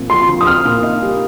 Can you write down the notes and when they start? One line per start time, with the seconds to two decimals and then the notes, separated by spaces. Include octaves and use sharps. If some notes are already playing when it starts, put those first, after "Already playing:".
Already playing: A#2 F3 C4
0.10 F4 C6
0.28 F3
0.41 D#6
0.47 C4 F6
0.65 A#2
0.83 D#4
1.02 G3